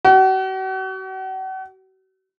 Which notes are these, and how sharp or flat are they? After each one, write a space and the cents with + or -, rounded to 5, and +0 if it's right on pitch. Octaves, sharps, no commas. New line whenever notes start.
F#4 +40